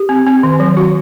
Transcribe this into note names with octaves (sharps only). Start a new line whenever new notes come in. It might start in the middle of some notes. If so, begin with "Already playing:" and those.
Already playing: G4
C4
C4
D#3
F#3
F#4